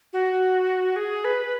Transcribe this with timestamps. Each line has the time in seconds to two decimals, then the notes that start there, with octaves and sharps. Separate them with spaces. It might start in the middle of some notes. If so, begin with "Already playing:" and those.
0.13 F#4
0.96 G#4
1.25 B4